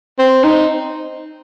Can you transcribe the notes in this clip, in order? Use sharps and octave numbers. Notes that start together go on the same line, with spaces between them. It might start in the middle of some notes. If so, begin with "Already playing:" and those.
C4
D#4